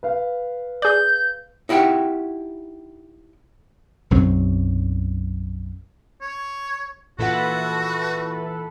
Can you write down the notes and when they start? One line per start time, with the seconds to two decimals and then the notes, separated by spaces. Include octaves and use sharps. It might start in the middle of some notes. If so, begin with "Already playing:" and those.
0.03 B4 F5
0.82 G#4 D5 G6
1.69 D#4 E4 G4 F#5 G5
4.11 B1 F#2 F#3 C4
6.21 C#5
7.19 A#2 E3 F4 F#4 A4 B4 F#5